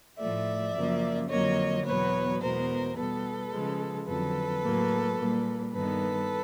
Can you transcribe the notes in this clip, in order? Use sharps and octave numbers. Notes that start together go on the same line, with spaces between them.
A2 F3 A3 D5 E5
F#2 C#3 F3 A#3
F2 D3 F#3 A#3 C#5 D#5
E2 B2 F#3 B3 B4 C#5
E2 B2 G#3 B3 A#4 C5
B2 G3 B3 A4 B4
C#3 F3 G#3
F2 D3 F#3 A4 B4
A2 F#3 A#3
A#2 G3 A#3
G2 D#3 G3 B3 A4 B4